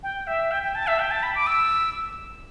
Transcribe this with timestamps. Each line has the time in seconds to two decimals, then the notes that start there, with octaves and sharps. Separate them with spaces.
0.03 G5
0.27 E5
0.51 G5
0.63 G5
0.75 A5
0.87 E5
0.99 G5
1.11 A5
1.23 B5
1.35 D6
1.47 E6